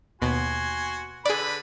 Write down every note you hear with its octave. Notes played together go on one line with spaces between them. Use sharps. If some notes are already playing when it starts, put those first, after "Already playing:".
D#2 B2 F#4 G#5 C6
D3 G#4 B4 D5 B5